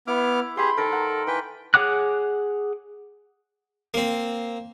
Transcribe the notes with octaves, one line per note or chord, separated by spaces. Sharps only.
B3 E4 D6 F6
G4 G#4 B5 C6
D#3 A4 A#4 C5
F#5
E3 B4 G5
G#4 C#5 F#5 D6 F#6
A#3 C4